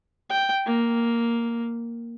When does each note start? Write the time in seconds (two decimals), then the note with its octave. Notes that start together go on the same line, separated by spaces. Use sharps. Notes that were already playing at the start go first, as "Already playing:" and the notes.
0.29 G5
0.66 A#3